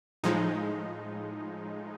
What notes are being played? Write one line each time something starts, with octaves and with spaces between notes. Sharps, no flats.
A2 F3 G#3 D#4